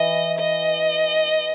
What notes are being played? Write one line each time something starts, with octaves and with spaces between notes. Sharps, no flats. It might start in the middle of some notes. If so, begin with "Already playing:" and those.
Already playing: E3 D#5
D#5